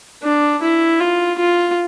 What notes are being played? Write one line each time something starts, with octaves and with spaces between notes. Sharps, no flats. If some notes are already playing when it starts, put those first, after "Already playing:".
D4
E4
F4
F4